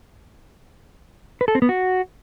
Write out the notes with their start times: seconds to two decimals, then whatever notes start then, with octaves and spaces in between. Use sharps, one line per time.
1.41 B4
1.48 A4
1.55 C4
1.62 B3
1.69 F#4